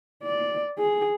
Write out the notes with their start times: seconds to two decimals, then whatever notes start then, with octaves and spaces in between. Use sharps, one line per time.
0.23 D5
0.79 G#4